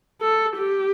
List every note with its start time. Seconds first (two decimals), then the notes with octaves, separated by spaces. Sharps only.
0.21 A4
0.56 G4